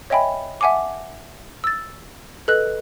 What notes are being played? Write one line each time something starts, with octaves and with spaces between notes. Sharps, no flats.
C#5 D#5 E5 G5 G#5 B5
E5 F#5 G#5 A5 D6
E6 A6
A4 B4 D#5 F#6